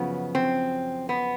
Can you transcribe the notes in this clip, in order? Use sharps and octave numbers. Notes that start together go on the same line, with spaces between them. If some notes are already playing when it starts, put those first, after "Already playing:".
Already playing: F#2 C#3 F3 B3
C4
B3